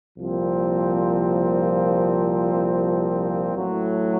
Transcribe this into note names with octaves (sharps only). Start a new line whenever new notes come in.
C2 A#2 F3 C4
A1 A2 F#3